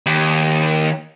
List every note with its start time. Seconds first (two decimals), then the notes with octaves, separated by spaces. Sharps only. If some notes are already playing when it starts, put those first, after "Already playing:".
0.06 D#2